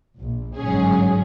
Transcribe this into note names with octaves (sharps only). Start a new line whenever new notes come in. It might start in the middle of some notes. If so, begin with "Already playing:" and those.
A#1
G1 G#2 F#3 C#4 G#4